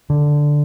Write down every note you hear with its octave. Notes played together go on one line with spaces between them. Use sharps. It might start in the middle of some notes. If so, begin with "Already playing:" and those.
D3